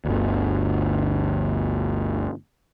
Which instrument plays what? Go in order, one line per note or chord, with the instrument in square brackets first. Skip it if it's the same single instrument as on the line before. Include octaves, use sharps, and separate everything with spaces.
[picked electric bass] G1 D2